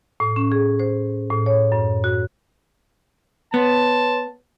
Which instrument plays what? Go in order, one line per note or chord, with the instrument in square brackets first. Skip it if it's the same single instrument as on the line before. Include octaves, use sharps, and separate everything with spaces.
[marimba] A2
C#4
G#4
C5
A2
C#5
F#2
F#4
[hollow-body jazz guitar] B3 [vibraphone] B4 C#5 C6 [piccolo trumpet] A5